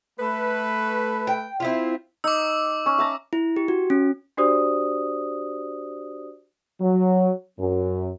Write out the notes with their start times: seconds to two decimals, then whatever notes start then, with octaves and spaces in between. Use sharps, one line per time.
0.19 A3 B4
1.27 G5
1.60 C4 E4 F4
2.24 D#4 D6 E6
2.86 C#4
2.98 E5 A5 A#5
3.33 E4
3.56 G4
3.68 F#4
3.90 C#4
4.37 D4 F#4 G4 C5 D5 D#6
6.80 F#3
7.59 F#2